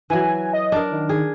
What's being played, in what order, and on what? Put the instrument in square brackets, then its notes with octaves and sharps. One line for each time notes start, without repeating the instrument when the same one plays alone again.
[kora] E3 F#3 [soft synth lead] G#5
[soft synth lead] D#5
[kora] D4 A#4
[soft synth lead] D#3
[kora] G#4